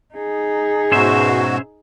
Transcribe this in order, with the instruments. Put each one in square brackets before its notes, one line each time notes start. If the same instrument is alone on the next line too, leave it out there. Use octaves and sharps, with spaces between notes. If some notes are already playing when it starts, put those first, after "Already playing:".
[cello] D#4 G#4
[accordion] G#2 B2 F#4 [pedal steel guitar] C#4 C5 E5